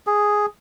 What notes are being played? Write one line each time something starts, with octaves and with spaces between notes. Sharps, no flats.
G#4